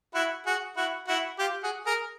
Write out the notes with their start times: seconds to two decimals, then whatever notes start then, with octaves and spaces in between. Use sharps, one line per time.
0.14 E4 F#4
0.46 F#4 G#4
0.77 E4 F#4
1.08 E4 F#4
1.39 F4 G4
1.63 F#4 G#4
1.86 G#4 A#4